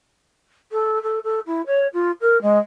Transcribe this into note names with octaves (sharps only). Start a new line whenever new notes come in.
A4
A4
A4
E4
C#5
F4
A#4
G#3